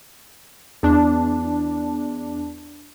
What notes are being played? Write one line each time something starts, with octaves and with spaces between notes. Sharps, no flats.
E2 D4